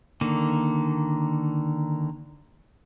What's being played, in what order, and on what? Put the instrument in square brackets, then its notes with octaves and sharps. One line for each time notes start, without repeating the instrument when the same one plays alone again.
[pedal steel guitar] D3 D#3 A#3